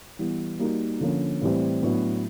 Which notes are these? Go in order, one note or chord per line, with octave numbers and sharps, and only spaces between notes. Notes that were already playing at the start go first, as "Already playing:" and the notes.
E3 G3 B3
G3 A#3 D#4 F#4
D3 F3 A#3 C#4
A2 E3 G3 C4
A2 F#3 B3 D4 F#4